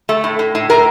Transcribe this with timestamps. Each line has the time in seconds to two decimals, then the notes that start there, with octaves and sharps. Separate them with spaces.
0.09 A3
0.24 A2
0.39 A2
0.55 A2
0.70 A2 A#4